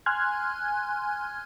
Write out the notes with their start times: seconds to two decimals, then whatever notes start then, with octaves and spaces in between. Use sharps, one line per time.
0.06 G#5 C6 F6 F#6 G#6